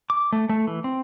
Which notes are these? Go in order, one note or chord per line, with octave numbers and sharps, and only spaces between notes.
D6
A3
A3
E3
C4